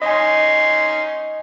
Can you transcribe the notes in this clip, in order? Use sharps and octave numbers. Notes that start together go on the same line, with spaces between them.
C#4 D#4 D#5 G#5 C6